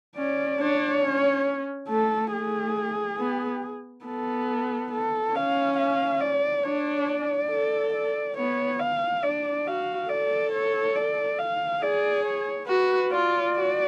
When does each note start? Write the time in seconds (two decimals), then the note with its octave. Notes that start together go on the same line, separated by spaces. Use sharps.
0.17 C#4 D5
0.59 D4 C#5
1.03 C#4
1.89 A3 A4
2.33 A3 G#4
3.19 B3
4.06 B3 A4
4.92 A4
5.35 C#4 F5
5.77 F5
6.20 D5
6.64 D4 C#5
7.08 D5
7.50 A4
7.93 D5
8.37 B3 C#5
8.79 F5
9.23 D4 D5
9.66 F#4 F5
10.09 A4 D5
10.52 C#5
10.96 D5
11.38 F5
11.82 G#4 D5
12.25 C#5
12.68 F#4 B4
13.11 F4 D5
13.55 F#4